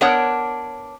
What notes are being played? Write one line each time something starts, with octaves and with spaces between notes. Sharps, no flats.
B3 D4 A#4 C#5 F#5